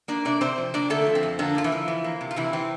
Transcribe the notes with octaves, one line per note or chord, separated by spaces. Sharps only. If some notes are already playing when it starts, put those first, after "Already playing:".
A#3 D4 D5
C3 D4 D5
C3 C4 C5
F3
A#3 D4 D5
D3 A3 A4
F3
C4
F2
D3 A#3 D4
D3 F4
E3 E4
F3
E3
A#3
C3
F4
C3 E3 E4
E3 C4